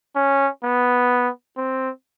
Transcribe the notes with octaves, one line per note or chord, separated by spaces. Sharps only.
C#4
B3
C4